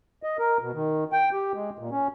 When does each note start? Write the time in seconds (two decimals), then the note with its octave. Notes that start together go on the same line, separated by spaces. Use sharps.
0.23 D#5
0.39 A#4
0.61 B2
0.74 D#3
1.13 G5
1.33 G4
1.54 G#3
1.79 A#2
1.91 C#4